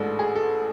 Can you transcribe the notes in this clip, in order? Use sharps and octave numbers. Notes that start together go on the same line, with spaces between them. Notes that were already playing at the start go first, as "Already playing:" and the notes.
Already playing: A1 G#2 G#3 D4 A4
G#4
A4